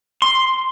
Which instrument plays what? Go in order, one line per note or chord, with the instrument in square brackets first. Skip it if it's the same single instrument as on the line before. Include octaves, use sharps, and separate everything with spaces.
[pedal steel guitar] C6